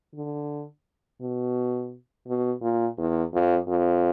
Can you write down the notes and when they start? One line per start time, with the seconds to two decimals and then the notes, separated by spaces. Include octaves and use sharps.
0.15 D3
1.21 B2
2.27 B2
2.63 A#2
2.98 E2
3.34 F2
3.68 F2